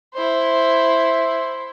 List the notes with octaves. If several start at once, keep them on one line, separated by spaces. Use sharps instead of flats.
E4 C5